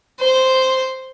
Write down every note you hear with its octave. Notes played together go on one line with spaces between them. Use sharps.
C5